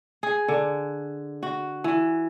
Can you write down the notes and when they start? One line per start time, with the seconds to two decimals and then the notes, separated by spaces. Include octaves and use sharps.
0.23 G#4
0.48 D3
1.43 F#4
1.84 E3